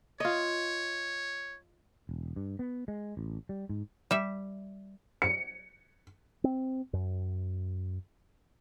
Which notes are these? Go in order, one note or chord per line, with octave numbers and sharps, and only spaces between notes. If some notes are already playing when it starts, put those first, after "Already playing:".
F4 C#5 D#5
E1
G2
B3
G#3
A1
G3
G#2
G3 E5
C#7
C4
F#2